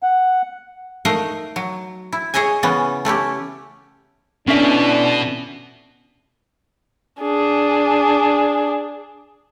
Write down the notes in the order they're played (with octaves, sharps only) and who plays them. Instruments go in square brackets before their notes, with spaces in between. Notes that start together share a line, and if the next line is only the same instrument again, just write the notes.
[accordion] F#5
[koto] A3 D#4 A#4 D#5 F5
F#3
E4
G#4 C#5 D#5 E5 G#5
C#3 E3 B3 C#4
A3 C#4 E4 G4
[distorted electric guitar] B2 [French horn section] D3 E3 D4 [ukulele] C#4 E5
[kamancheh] D4 G#4